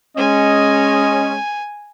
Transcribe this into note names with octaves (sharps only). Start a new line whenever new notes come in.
G#3 C#4 D#5 G#5